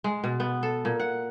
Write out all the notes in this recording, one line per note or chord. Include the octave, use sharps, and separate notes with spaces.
G#3
B2
B3
A4
A#2
F#5